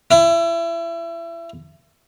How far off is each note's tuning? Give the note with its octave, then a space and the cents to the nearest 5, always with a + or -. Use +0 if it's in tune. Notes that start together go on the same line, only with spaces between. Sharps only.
E4 +30